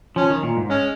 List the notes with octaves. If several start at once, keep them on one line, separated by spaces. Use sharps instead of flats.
F3 C#4
D#3
A#2
G#2
G#3 C#4